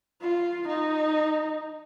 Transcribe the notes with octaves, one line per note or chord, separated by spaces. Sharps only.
F4
D#4